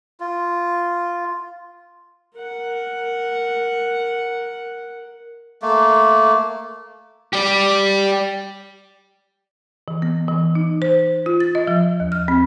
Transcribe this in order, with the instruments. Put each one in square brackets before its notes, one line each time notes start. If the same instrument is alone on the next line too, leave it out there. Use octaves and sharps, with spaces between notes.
[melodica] F4
[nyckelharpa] A#4 F#5
[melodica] A3 A#3
[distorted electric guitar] G4 D5
[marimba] E3
B3
E3
D#4
C5
F4
A6
D#5
F3
D#2
F6
C4